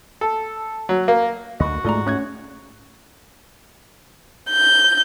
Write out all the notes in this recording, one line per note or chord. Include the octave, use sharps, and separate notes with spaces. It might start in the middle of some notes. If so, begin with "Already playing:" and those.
A4
F#3
A#3
D2 D3 F#4 D#5 F#5
G#2 G#3 A3 F4 D5 A#5
A3 C#4 F#6 G#6
G6